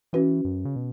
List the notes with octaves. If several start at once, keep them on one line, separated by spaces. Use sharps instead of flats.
E3 C#4 F#4 B4
F#2
C#3
B2